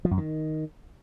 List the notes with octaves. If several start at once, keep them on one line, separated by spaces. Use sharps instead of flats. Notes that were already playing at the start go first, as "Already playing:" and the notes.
F3
F#2
D#3